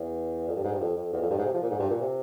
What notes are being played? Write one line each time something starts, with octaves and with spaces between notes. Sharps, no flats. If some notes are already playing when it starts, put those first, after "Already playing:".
Already playing: E2
F2
G2
G#2
G2
F2
F2
E2
F2
G2
G#2
C3
F3
A#2
G#2
G2
A#2
C3